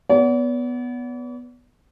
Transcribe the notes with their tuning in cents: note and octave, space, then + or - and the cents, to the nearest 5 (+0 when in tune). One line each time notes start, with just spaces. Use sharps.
B3 +0 D5 -45